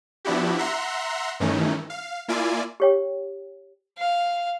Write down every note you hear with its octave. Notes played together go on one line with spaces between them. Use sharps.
F3 B3 D4 E4 F#4 G4
E5 F#5 A#5 C6
G2 D#3 E3 A3 C#4 D#4
F5
A#3 E4 F4 D5 G#5
G4 C#5 G5
F5